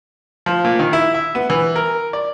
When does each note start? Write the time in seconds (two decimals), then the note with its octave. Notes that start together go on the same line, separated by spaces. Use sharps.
0.46 F3
0.64 A#2
0.79 D#3
0.93 E4
1.14 E5
1.35 B3
1.50 E3
1.76 A#4
2.13 D5